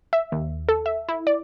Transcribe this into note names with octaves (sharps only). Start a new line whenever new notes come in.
E5
D#2
A4
E5
E4
D5